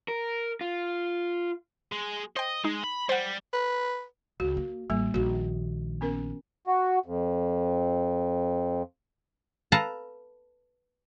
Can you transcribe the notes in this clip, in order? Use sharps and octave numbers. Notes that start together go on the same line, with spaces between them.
A#4
F4
G#3
C5 D#5 G5
G#3 D#4
B5
G3 C5 F#5
B4
C#2 F#4
A#3
A1 G3 A#3
A#1 D#3 F#4
B3 C#4 A#4
F#4
F2
A4 B4 F5 A5 A#5